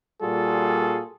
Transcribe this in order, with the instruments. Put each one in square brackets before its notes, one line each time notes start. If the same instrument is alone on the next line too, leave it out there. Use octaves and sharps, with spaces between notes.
[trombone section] A#2 G3 F4 F#4 G#4 A4